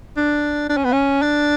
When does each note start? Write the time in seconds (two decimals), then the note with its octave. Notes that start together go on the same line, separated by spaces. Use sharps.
0.17 D4
0.69 D4
0.77 C#4
0.84 B3
0.92 C#4
1.22 D4